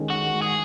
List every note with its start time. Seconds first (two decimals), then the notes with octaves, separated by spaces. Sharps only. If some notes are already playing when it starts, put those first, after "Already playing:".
Already playing: D#3 G#3 C#4
0.10 D#3 F#4
0.33 G#3
0.42 G#4